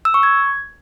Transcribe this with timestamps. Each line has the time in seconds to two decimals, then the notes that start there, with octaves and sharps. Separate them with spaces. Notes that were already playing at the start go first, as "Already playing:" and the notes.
0.05 E6
0.14 C#6
0.23 G#6